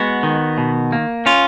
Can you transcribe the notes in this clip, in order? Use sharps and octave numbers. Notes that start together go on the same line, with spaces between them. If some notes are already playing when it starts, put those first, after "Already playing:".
Already playing: G#3 B3 F#4
D#3
B2
A#3
C#4 F4